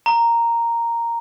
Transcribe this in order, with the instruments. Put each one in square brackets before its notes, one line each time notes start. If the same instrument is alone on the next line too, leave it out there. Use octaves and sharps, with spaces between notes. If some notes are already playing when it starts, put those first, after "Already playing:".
[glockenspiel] A#5